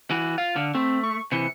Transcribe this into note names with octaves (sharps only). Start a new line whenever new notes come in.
E3 F#4
F4 F5
D3
A3 C4
C#6
C3 E3 C#7